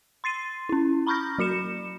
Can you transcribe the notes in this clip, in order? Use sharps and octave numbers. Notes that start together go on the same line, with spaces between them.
C6 A6 C7 D#7
C#4 E4
A#5 B5 C#6 F6 G6 A#6
F#3 F#4 C#7 E7